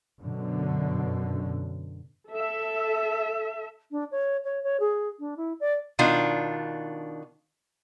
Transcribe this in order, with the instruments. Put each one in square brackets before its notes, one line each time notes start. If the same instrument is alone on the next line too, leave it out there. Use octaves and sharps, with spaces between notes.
[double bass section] F#2 B2 D3
[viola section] A4 E5
[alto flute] D4
C#5
C#5
C#5
G#4
D4
E4
D5
[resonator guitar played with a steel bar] B2 D#3 D4 F4